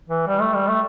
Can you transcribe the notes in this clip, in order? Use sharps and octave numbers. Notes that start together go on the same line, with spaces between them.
E3
G3
A3
G3
A3